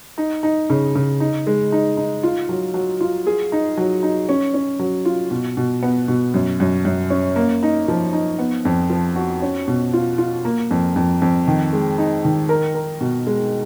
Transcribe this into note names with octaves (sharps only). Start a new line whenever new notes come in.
D#4
D#4
C#3
C#3
D#4
G#3
D#4
D#4
F4
F#3
F#3
F4
G#4
D#4
F#3
D#4
C#4
C#4
F#3
F4
B2
B2
B3
B2
F#2
F#2
F#2
C#4
A#3
D#4
F3
D#4
B3
F2
F3
F#4
C#4
B2
F4
F4
A#3
F2
F2
F2
D#3
G#3
D#4
D#3
A#4
A#4
B2
G#3